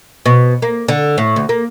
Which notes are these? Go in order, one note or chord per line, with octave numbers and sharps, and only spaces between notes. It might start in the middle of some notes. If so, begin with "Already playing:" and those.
B2
A#3
D3
A2
D2
A#3